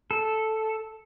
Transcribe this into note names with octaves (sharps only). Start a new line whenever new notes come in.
A4